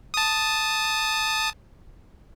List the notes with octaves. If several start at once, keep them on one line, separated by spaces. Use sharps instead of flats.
A5 D#6